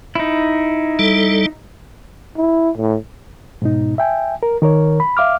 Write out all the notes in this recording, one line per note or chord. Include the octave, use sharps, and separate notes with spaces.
D#4 E4
G3 A4
E4
A2
G#2 B2 D#4
E5 G5 G#5
A#4
D#3 A#4 C#5
B5
E5 F5 D6 F6